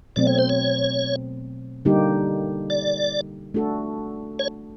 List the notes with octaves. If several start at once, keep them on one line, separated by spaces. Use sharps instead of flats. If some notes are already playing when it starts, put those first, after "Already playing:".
B2 F#3 A3 C4 D5
C#5
C5
C#5
D3 G3 A#3 D#4 G4
D5
A3 D4 F#4 A4
C#5